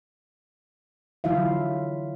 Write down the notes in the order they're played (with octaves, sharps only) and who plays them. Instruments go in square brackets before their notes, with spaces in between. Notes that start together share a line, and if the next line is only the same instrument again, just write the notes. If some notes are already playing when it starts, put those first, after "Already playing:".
[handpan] D3 F#3 E4 F4 E5 F5